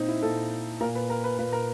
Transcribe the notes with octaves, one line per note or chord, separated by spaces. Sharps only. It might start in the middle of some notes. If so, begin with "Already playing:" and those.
Already playing: A#2 C4 D#4
E4
A#2 A4
A#2 A#4
B4
A#4
B4
A#2 B4
A#4